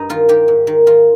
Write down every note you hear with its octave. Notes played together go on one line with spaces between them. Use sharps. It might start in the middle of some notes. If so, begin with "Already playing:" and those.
Already playing: G2 D#4
D#3 F4
D#3 G4
G#2
D#3
D#3 F4